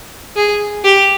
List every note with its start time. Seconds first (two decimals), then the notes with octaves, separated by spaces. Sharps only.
0.36 G#4
0.85 G4